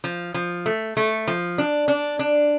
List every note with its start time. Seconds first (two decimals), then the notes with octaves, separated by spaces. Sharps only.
0.04 F3
0.34 F3
0.66 A3
0.97 A3
1.27 F3
1.58 D4
1.88 D4
2.19 D4